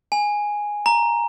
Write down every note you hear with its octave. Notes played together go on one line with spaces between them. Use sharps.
G#5
A#5